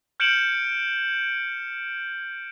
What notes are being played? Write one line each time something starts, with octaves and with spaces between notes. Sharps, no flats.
F6 G6 C#7 D7 E7 F#7